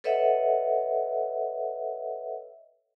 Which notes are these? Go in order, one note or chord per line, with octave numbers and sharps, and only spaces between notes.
A4 B4 C#5 D#5 E5 F#5